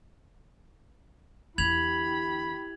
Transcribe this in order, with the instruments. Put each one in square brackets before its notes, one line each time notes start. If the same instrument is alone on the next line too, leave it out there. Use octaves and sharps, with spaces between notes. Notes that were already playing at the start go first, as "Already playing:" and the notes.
[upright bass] E2 D3 [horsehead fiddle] E4 G4 [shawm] B5 [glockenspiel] G#6 F7 F#7